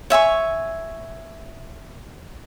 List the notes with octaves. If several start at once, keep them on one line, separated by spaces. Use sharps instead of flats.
C#5 E5 G#5 C#6